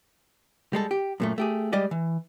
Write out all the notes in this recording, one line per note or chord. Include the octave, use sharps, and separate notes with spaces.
G3 G#3 A4
G4
F#2 A#2 A3
A3 G4 G#4
G3 G#3 G4 D5 D#5
E3